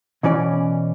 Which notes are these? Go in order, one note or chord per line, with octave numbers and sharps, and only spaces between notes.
B2 E3 C#4 D5